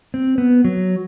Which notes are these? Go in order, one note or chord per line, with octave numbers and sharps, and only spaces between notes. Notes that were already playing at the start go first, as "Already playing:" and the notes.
C4
B3
F#3